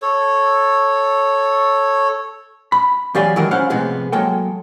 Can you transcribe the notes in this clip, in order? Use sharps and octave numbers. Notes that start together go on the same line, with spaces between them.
A4 C#5
B5
E2 F#3 G4 D5 F5 G#5
D#3 E3 F#3 G#3 E4 A#4
C#4 E4 C5 F5 F#5
A2 C3 F3 G#3 B3
F#3 G#3 A#3 A4 G5